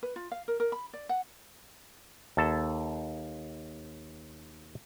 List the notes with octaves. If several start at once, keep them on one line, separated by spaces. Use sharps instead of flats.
B4
F4
F5
A#4
A#4
B5
D5
F#5
D#2 A4 A5